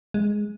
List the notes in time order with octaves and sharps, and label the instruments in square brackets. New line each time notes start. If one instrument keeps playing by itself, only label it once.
[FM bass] G#3